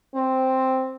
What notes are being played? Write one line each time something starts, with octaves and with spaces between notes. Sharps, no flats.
C4